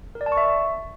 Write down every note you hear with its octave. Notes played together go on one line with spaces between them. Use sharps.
A#4
D5
A5
C#6
E5